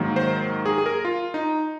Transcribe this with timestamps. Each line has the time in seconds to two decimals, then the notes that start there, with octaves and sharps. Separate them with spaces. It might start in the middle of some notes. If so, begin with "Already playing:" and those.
Already playing: G#2 D#3 F#3 A#3
0.16 C5
0.66 G#4
0.78 G#4
0.86 A#4
1.05 F4
1.34 D#4